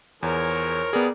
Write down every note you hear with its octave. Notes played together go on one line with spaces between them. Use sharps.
E2 F3 G#4 A#4 C#5
G3 B3 D#4 G#4 D5